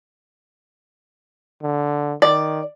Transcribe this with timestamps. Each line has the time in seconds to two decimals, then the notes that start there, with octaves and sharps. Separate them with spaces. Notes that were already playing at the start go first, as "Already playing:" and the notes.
1.62 D3
2.22 D#3 D5